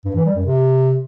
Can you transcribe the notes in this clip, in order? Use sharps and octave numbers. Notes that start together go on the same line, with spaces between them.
G2
E3
G3
F#2
C3